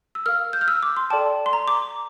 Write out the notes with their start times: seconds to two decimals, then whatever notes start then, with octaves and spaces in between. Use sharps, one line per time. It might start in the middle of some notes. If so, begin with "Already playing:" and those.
0.15 E6
0.26 A#4 F5 F6
0.53 G6
0.61 F6
0.68 E6
0.83 D6
0.97 C6
1.10 A4 D5 G5 A5
1.46 C6
1.53 A#5
1.68 D6